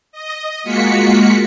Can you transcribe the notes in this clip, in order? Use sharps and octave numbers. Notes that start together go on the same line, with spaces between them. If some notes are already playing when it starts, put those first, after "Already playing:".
D#5
G#3 A#3 F4 F#4 B6 C#7